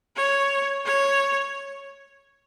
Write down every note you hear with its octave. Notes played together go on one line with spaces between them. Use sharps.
C#5
C#5